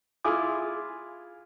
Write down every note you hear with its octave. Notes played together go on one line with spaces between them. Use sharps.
E4 F4 G#4 D6